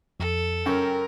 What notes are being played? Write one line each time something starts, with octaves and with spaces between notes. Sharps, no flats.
F2 A4
F#2 C#4 A#4 G5